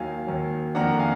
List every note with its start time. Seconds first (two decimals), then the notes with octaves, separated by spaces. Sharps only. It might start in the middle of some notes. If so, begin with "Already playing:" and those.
Already playing: D#2 D#3 F#3 F5 G#5
0.27 D#2 D#3 F#3
0.75 F2 D#3 A#3 D4 F#5 A#5
0.99 F5 G#5